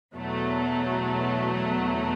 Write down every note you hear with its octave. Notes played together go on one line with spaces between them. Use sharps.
E2 B2 F#3 A3